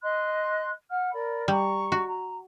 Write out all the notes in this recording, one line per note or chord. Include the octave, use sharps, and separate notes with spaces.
D#5 C6 F#6
F#5 F6
A#4 D5 B5
G3 A#5 C#6
F#4
A#5